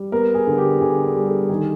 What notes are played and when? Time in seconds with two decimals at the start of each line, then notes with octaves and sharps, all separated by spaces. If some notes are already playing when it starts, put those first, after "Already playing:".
Already playing: G3
0.12 B3 A#4
0.34 G#4
0.47 D3
0.58 G4
0.81 D3 G#4
1.04 G#4
1.16 G3
1.27 A4
1.49 D#3 G#4